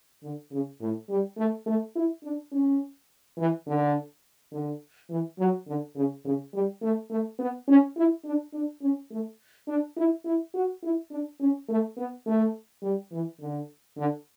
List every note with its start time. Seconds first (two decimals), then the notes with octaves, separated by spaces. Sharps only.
0.23 D3
0.52 C#3
0.81 A2
1.09 G3
1.38 A3
1.66 A3
1.96 E4
2.24 D4
2.52 C#4
3.38 E3
3.67 D3
4.52 D3
5.10 E3
5.39 F#3
5.67 D3
5.96 C#3
6.25 C#3
6.53 G3
6.82 A3
7.10 A3
7.39 B3
7.68 C#4
7.96 E4
8.25 D4
8.54 D4
8.82 C#4
9.11 A3
9.68 D4
9.97 E4
10.25 E4
10.54 F#4
10.83 E4
11.11 D4
11.40 C#4
11.69 A3
11.97 B3
12.26 A3
12.83 G3
13.12 E3
13.40 D3
13.97 D3